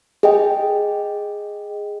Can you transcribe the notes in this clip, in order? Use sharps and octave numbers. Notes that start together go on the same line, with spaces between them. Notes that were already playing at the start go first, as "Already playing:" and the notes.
G#4 D#5 G5